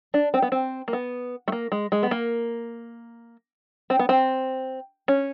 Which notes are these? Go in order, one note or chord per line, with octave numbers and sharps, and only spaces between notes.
D4
C4
B3
C4
A#3
B3
A3
A#3
G#3
G#3
B3
A#3
C4
B3
C4
C#4